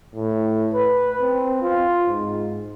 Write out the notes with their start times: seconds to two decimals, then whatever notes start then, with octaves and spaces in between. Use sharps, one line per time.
0.15 A2
0.73 B4
1.21 C4
1.62 F4
2.07 G#2